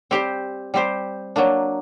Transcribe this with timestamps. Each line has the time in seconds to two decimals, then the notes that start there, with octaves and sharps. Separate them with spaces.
0.11 G3 C4 G4 C5
0.74 G3 C4 G4 C5
1.36 F#3 A#3 D4